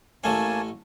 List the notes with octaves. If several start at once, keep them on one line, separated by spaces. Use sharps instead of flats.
A1 A3 A#3 C#4 G#5 A5